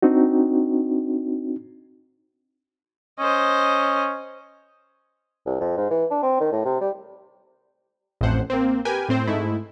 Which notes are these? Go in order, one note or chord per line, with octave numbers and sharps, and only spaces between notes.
C4 D4 D#4 F#4
C#4 C5 D#5
C2
F2
G#2
E3
D4
C4
D#3
A2
C3
G3
A1 F2 A2 C5 F#5
A#3 C4
G4 A#4 B4 G5 G#5
A2 C4 C5
G#2 G#3 A3 E4